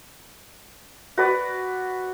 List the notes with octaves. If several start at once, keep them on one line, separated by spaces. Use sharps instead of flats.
F#4 B4 D5